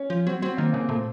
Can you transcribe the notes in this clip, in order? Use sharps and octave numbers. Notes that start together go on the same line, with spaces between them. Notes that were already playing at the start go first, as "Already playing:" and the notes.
Already playing: C#4
F3
F#3 C4
F#3 C4
D#3 A#3
C#3 A#3
A#2 A3